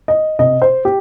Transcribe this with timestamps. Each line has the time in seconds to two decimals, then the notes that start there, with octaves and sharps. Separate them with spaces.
0.08 D#5
0.39 C3 D#5
0.62 C5
0.85 G4